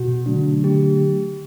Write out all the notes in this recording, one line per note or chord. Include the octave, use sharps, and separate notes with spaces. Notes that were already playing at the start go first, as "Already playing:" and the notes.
Already playing: B2 F#4
D3 F#3 A3 D4
D3 F#3 A3 D4 G4